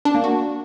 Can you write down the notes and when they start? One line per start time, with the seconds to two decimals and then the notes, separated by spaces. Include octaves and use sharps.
0.05 D4
0.15 A#3
0.24 F#4